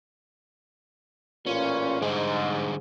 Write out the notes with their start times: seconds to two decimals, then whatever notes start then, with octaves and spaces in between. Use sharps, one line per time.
1.47 A1 A#2 C#4 F4
2.02 G#2 D3 G3 G#4